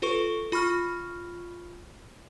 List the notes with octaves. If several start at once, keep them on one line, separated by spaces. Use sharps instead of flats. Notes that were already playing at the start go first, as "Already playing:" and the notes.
F4 A4 B4 C#6
F4 B5 C#6 F6